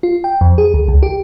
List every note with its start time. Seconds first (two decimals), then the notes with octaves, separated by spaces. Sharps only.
0.03 F4
0.24 G5
0.41 F2
0.58 G#4
0.74 D2
0.88 C#2
1.03 G4